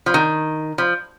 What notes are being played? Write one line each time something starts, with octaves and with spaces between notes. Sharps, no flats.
F3
D#3
F3